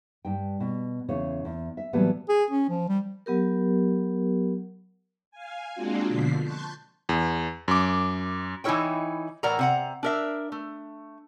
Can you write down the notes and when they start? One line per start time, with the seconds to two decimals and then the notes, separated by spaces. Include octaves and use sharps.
0.25 G2 G5
0.60 B2
1.09 E2 C#3 C#5
1.45 E2
1.77 E5
1.93 A2 E3 F#3 G3 A3 B3
2.29 G#4
2.50 C#4
2.69 F3
2.89 G3
3.26 F#3 B3 G4 A#4
5.31 F5 G#5
5.74 G#3 A#3 C4 D4 F4 F#4
6.08 B2 D3 F3 B6 C7
6.42 A5 C6 C#6 F#6 G6
7.09 E2
7.68 F#2 D6
8.64 E3 D#4 E4 A#4 C#5 G5
9.43 A2 E3 A#4 D5 F#5 A#5
9.59 C3 F#5 A#5
10.03 D4 A#4 E5
10.52 A3